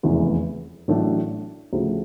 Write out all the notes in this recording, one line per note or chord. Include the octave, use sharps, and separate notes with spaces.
F1 E2 C#3 E3 G#3
A1 A2 F#3 A3 D4
D2 C#3 F3